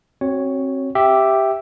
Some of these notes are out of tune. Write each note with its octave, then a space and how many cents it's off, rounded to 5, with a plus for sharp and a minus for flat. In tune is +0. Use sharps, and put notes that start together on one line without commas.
C4 +30 F#4 +15 C#5 +0
G4 +0 E5 +0